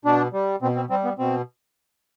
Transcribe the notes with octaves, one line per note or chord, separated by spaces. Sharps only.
B2 D4
G3
B2 C4
C4
G3 C4
B3
B2 C4